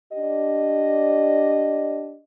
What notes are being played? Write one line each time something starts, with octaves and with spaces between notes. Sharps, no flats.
D4 G4 D5 D#5